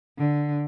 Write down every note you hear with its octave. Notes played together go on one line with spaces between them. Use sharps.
D3